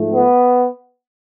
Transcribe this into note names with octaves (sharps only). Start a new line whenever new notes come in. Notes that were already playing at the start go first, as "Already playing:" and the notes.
Already playing: G#2 F3 A3
B3